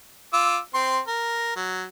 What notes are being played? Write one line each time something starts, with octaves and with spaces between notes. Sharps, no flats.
F4 D6 E6
C4 C6
A#4
F#3